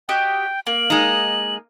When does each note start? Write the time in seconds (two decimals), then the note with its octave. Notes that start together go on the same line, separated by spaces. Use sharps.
0.09 F#4 G4 D#5 G5
0.67 A#3 F#7
0.90 G#3 D#4